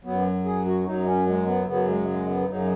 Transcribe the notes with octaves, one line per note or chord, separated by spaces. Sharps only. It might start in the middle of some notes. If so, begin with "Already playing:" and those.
F#2 F#3 B3
G#4
F#4
F#2 F#3 D#4
C#4
G#3
B3
F#2 C#3 F#3 B3
G#3
G#3
B3
F#2 C#3 F#3 D#4